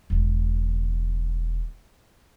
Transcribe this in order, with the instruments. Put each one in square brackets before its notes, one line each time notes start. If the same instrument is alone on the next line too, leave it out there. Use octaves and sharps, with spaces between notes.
[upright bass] E1 C#3